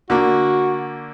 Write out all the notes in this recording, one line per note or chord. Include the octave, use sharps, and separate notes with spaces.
D3 A#3 F#4